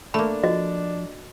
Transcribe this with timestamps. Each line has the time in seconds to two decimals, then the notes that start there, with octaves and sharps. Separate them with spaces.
0.14 A3 A#3 D4 B5
0.43 F3 F#4 D#5